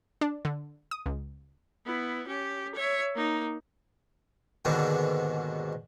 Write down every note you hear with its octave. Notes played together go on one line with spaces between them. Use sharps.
D4
D3
D#6
C#2
B3 E4
C#4 G4
C#5 E5
A#3 D#4
D#2 G#2 B2 D3